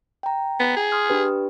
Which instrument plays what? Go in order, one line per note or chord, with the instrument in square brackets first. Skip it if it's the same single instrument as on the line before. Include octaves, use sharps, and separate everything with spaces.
[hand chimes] G5 A#5
[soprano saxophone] B3
G#4
[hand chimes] C6 D#6 F6
D4 G4 B4